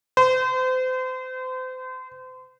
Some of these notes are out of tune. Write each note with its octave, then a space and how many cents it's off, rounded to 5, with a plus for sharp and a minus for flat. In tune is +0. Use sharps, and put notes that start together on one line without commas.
C5 -35